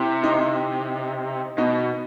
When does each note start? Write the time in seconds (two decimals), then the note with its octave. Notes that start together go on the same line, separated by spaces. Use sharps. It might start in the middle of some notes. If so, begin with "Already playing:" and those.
Already playing: C3 E4
0.23 D#4
1.58 B2 D#4